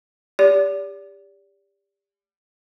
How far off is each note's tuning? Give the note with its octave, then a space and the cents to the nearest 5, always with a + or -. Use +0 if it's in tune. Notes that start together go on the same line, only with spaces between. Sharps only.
G4 +25 D5 -30